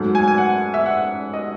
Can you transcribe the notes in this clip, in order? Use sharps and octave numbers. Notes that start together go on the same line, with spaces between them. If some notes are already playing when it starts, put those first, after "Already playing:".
Already playing: G#2 F#3 A3
G#5
G#5
F#5
E5
F#5
D#5